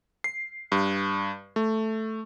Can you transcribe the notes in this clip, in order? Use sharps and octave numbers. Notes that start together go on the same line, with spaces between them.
C7
G2
A3